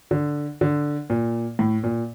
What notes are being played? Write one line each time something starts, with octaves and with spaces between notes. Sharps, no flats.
D3
D3
A#2
A2
A#2